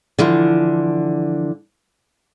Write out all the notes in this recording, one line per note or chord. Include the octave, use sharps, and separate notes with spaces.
D3 E3 F3